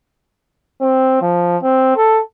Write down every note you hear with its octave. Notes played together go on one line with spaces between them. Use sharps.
C4
F3
C4
A4